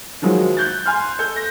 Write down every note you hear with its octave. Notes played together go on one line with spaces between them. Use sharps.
D#3 F3 F#3 G#3
F#6 G6 A6
G#5 C6 F6
A4 G6
A#6